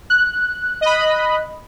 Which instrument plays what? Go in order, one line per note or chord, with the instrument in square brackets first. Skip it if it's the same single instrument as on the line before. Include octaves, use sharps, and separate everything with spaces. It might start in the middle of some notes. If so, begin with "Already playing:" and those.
[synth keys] F#6
[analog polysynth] D#5 B5